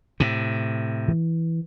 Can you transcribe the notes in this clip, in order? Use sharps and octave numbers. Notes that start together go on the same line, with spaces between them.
A2 C3
E3